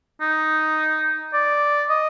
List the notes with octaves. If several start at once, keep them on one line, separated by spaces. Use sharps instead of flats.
D#4
D5
D#5